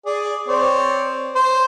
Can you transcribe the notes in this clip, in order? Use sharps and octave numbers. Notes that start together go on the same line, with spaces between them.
G#4 D5
C4 C#5 D5
C5